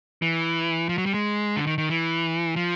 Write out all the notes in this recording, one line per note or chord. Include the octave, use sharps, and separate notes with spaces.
E3
F3
F#3
G3
G#3
D3
D#3
D#3
E3
F3